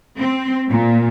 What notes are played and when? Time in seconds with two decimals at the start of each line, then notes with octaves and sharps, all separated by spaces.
0.18 C4
0.68 A#2